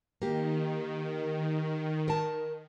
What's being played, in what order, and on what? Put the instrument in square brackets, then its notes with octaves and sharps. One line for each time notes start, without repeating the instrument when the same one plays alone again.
[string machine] D#3 [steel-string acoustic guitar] A#3 G4
[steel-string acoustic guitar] A#4 A5